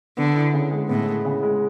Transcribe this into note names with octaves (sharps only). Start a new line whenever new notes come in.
D3 B3
E4
C#3
G#3
A2 B3
E4
C#3
G#3